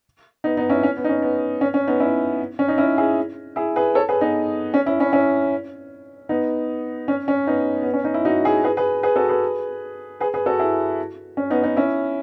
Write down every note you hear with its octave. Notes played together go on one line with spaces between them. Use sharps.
B3 D#4
B3 D#4
C#4 E4
C#4
B3
D#4
C#4
B3
C#4
C#4
B3 D#4
C#4 E4
C#4
D#4
C#4 E4
E4 G#4
E4 G#4
G#4 B4
A4 C#5
G#4 B4
B3 D#4
C#4
C#4 E4
C#4 E4
C#4 E4
B3 D#4
C#4
C#4
B3 D#4
B3
C#4
D#4
E4
D#4 F#4
E4 G#4
G#4 B4
G#4 B4
G#4 B4
F#4 A4
G#4 B4
G#4 B4
G#4 B4
F#4 A4
E4 G#4
C#4
B3 D#4
B3 D#4
C#4 E4